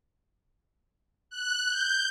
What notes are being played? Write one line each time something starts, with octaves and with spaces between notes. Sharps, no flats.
F#6
G6